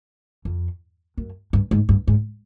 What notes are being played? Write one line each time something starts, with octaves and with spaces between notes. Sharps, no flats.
F2
F#2
G2
G#2
G2
G#2